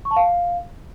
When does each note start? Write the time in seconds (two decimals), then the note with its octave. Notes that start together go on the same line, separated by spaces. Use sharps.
0.05 C#6
0.11 A5
0.16 F5